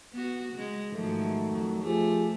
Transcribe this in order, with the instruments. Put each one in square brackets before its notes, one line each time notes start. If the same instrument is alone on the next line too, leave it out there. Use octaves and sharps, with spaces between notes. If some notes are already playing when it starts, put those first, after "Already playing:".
[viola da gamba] B3 F#4
C#3 G#3
[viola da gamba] G#2 F3 [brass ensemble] D#3 F#3 A3
[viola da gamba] F2
[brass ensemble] F3 G4 G#4 [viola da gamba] A3